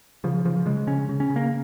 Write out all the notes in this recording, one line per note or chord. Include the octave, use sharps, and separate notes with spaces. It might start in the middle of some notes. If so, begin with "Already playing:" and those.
C#3 F3
C#3 F3
C#3 G#3
C#3 C#4
C#3
C#4
C#3
A#3